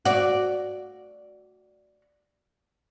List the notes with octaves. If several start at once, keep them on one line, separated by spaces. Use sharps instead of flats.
F#4 D5